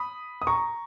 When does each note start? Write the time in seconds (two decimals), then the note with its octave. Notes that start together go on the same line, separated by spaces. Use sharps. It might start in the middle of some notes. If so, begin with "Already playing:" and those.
Already playing: B5 D#6
0.42 D#6
0.47 A#5 C#6